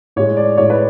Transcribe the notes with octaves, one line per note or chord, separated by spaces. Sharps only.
A2 G#3 C#5
D5
A2 G#3 C#5
B4